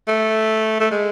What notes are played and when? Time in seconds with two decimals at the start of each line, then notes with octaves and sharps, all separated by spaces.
0.08 A3
0.81 A3
0.91 G#3